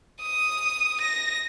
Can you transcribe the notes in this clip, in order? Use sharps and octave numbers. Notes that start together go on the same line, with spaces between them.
D#6
A#6